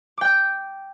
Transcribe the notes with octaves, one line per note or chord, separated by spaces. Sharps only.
G5 D6 G6